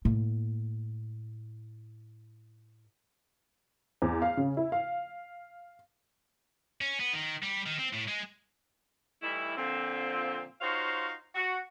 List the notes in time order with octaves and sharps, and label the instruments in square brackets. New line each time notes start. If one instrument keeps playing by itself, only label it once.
[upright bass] A2 A#3
[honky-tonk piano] E2
F5
C#3
E4
F5
[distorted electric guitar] C#4
B3
D#3
G3
D#3
C4
A2
G#3
[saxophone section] E3 G3 A3 D#4 E4
A#2 D3 F3 C4
D#4 F4 F#4 C5 C#5 F5
F#4